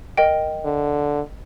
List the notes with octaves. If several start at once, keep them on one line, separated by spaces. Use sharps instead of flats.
A#4 D#5 G5
D3